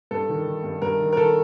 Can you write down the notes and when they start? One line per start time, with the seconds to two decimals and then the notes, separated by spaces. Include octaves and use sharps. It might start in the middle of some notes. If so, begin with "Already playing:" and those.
0.11 G2 A4
0.29 D#3
0.46 D#3
0.64 G2
0.82 G2 A#4
1.00 D#3
1.13 A#4
1.17 D#3 A4